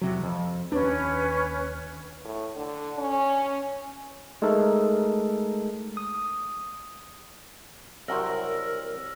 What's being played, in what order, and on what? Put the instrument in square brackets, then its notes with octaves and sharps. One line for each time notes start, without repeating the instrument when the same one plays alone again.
[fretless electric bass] E2 C3 F#3
F2
[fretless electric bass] D#2 D4 [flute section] C#4 B4
[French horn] A2
D3
C#4
[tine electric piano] G#3 A3 D#4 A4 A#4
D#6
[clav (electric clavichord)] C2 F#3 C5 [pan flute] A#4 [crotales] E6 F6 A#6